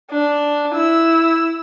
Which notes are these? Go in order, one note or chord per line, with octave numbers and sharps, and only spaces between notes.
D4
E4 E6